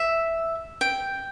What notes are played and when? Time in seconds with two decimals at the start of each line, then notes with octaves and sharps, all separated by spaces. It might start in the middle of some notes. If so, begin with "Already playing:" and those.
Already playing: E5
0.81 G5